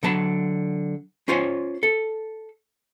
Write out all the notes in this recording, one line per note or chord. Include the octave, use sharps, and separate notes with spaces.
D3 F#3 A5 B5
C#4 F4 C5 C#5 G#5
A4